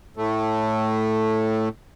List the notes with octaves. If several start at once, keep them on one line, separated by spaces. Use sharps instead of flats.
A2 A3